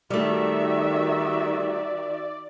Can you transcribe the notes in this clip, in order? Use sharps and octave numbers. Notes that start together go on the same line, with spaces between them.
D#3 G3 A3 F#4 D5 E5